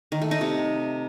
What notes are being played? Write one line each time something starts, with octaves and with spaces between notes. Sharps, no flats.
D#3
A3
D#4
C3